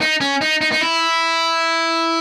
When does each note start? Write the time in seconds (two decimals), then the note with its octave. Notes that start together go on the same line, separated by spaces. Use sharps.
0.01 D#4
0.21 C#4
0.41 D#4
0.61 D#4
0.72 D#4
0.81 E4